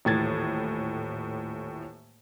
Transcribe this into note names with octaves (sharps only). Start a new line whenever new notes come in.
D#1 A2 E3 G#6 A6